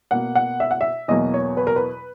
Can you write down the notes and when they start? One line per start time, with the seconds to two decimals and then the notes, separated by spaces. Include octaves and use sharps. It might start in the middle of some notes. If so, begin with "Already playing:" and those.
0.11 B2 A#3 F#5
0.35 F#5
0.60 E5
0.71 F#5
0.81 E5
1.08 E2 B2 F#3 A#3 D#5
1.34 C#5
1.57 B4
1.67 A#4
1.76 B4